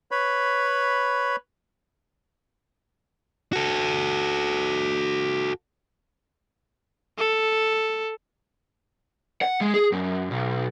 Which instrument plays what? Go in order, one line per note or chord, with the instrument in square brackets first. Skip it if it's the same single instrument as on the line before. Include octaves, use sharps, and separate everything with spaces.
[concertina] B4 C#5 B5
[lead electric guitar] F#4 A4
[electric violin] A4
[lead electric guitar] F#5
G#3
G#4
F#2
B1